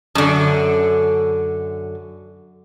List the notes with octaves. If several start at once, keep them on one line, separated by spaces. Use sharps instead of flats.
F#2 D3